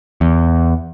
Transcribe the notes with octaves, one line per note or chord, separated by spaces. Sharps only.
E2